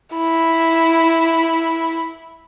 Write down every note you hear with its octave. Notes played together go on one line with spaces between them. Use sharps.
E4 B5